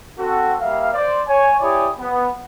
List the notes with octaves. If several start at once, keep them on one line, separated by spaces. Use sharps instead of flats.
C4 F#4 A4
G3 A#3 E5 F5
C5 D5
C#5 G#5
E4 G4 C#5 D5 G#5 D#6
B3